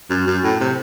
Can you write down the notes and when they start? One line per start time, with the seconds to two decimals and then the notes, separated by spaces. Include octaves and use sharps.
0.10 F#2
0.26 F#2
0.44 A2
0.60 C3